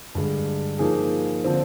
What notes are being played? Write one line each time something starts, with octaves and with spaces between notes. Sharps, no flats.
G2 D3 G#3
F3 A#3 D#4 G#4
D3 F3 C4